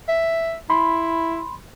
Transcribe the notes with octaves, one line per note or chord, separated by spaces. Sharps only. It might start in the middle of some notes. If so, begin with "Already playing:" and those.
E5
E4 B5 C6